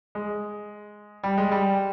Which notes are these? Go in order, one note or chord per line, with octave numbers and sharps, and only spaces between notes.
G#3
G3
G#3
G3